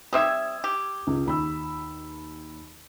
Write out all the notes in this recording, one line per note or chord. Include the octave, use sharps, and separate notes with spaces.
G3 C4 E5 D#6 E6 G#6
G4
C#2
D#2 B5 E6